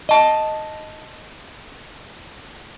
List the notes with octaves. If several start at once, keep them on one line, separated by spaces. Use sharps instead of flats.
D#5 A5